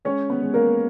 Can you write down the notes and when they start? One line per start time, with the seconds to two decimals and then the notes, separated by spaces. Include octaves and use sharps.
0.05 G#3 C#4 C#5
0.30 B3 B4
0.42 G#3
0.54 A#3 A#4